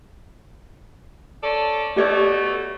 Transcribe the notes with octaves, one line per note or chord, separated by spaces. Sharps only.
C#4 A4 D5
B2 A3 G4 C#5 D5